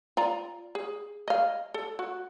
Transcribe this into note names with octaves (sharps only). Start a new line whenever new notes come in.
F4 D5 A#5
G#4
D#5 F5
A4
F#4